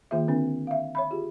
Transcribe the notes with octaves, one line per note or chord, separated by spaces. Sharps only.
D#3 A#3 F4 G#4 E5
D3 C4 D4
E5 F5
C#5 E5 B5
F4 G4 G#4